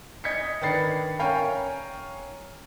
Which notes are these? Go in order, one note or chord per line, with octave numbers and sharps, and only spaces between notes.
D#5 G#6 B6 C#7
D#3 D4 B4 A6 C7 C#7
C#4 A#4 C#5 F5 G5 G#5